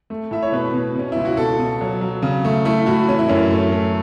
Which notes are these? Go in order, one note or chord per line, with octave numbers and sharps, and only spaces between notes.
A3
A2 E5
C#5
B2 B4
B2
B2 C#4
C#2 E4
F#4
B2 A4
B2
F#3
F#3
C#3
A3
A3 E4
A2 F#4
E3 C#4
E4
F#2 C#4
A3
A3